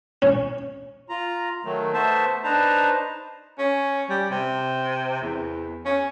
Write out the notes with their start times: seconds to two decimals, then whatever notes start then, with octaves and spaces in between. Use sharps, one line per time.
0.22 C#4
1.09 F4 A#5
1.65 D#3 F#3 A3
1.93 A3 B3 C5 E5 A5
2.44 D4 D#4 B4 C5 A5 A#5
3.58 C#4
4.10 G3
4.30 C3
5.22 E2
5.85 C#4